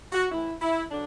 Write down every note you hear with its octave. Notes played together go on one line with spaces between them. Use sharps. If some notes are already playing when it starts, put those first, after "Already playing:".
F#4
A2 E3 E4
E4
D3 F#3 D4